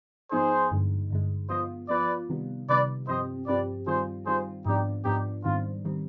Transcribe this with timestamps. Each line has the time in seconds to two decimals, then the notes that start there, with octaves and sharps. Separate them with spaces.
0.31 G#2 F3 B3 D#4 G#4 C5
0.71 G2 D3 G#3
1.11 G2 D3 G#3
1.50 F3 B3 F4 C5 D#5
1.89 F3 B3 F4 B4 D5
2.29 C3 D#3 G3 B3
2.69 C3 D#3 G3 B3 B4 D5
3.08 G2 F3 C4 G4 C5 D#5
3.48 G2 F3 C4 G4 B4 D5
3.87 D#3 G3 C4 F4 G#4 C5
4.26 D#3 G3 C4 F4 G#4 C5
4.65 G#2 F3 B3 D4 D#4 G4
5.05 G#2 F3 B3 D4 D#4 G4
5.45 G#2 D#3 G3 C4 F4
5.85 D#3 G3 C4